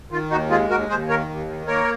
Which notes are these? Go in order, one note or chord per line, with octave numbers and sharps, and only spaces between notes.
D#3 F4
D#2 D#4 F#4
G#3 F4 G#4
D#2 F#4 A#4
D#2 G#4 C5
D#3 A#4 C#5
D#2
D#3
A#3 A#4 C#5